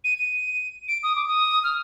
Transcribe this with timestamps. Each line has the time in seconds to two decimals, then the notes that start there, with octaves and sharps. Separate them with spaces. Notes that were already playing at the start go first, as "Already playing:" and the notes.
0.04 D#7
0.18 D#7
0.88 D7
1.03 D#6
1.15 D6
1.28 D#6
1.63 F6